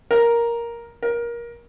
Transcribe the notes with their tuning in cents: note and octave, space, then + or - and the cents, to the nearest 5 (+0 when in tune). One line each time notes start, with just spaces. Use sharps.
A#4 +5
A#4 +20